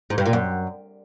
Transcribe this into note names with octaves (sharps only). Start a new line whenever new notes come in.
G#2
G2
A#2
F#2